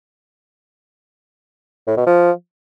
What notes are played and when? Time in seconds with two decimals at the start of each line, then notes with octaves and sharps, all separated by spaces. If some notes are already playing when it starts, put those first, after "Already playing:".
1.88 A2
1.97 B2
2.07 F3